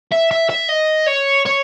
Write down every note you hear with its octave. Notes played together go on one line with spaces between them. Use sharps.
E5
E5
E5
D#5
C#5
C#5